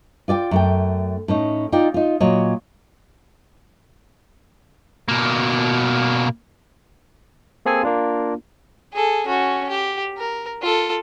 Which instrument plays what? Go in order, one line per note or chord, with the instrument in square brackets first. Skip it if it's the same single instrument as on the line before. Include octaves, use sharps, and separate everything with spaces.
[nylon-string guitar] F4 D5 E5 G5
F#2 A3 G5
A2 C#4 D#4
D#4 F4 D5 G5
D#4 F4
A#2 F#3 C#5 D#5
[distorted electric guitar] B2 A#3
[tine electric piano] A#3 C4 G#4 A4 G#5
A#3 D4 F4
[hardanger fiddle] G#4 A4
C#4 F#4
G4
A#4
F4 A4